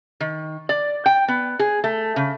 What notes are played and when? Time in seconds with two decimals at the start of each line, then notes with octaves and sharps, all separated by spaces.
0.20 D#3
0.69 D5
1.06 G5
1.28 B3
1.59 G#4
1.84 A3
2.16 C#3